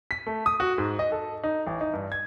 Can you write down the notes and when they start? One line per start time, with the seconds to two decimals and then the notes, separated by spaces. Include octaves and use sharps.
0.11 B6
0.27 A3
0.46 D#6
0.60 F#4
0.78 G#2
0.99 D#5
1.12 A4
1.43 D#4
1.67 A1
1.81 D#4
1.93 G2
2.12 G#6